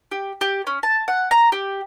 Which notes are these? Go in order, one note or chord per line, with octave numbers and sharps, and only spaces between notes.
G4
G4
C#4
A5
F#5
A#5
G4